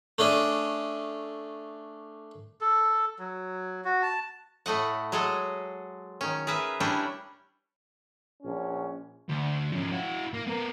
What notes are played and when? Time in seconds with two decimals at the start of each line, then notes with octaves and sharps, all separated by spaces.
0.18 A3 C#4 D4 G#4
2.61 A4
3.19 F#3
3.85 F#4
4.03 A5
4.66 A2 A3 D#5 F#5
5.12 F#3 G#3 G#4 A4 D#5
6.21 D#3 C#4
6.47 G#4 A#4 B4 E5
6.80 G3 C#4 D4 E4 C#5
8.43 A#1 C#4
9.29 D2
9.72 F3 C#4
9.92 E4 F#4
10.34 A#3
10.47 B3 A#4